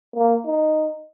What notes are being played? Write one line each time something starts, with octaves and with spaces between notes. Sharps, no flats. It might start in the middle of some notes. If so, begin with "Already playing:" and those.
A#3
D#4